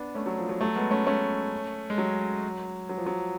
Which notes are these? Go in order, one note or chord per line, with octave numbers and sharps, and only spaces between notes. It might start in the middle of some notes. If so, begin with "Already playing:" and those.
Already playing: B3 D4
A3 C#4
F#3
F3
F#3
F#3 A3
G#3 B3
A3 C#4
A3 C#4
G#3
F#3
F#3
F3
F#3